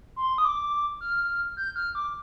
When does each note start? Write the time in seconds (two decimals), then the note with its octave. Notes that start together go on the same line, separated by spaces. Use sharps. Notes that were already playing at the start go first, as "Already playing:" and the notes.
0.16 C6
0.38 D#6
0.45 D6
1.01 F6
1.57 G6
1.76 F6
1.95 D6